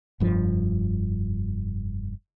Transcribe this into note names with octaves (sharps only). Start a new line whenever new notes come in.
F1 G2 F3